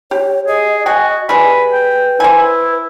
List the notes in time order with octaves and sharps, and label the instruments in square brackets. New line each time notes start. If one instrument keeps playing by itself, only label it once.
[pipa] G4 [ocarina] C#5
[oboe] G#4 [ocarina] D#5
[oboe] F#4 [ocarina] D#5 [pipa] G5 G#5
[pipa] G3 G#3 G#4 [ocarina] B4 [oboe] B5
[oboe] G5
[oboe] E4 [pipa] C5 G#5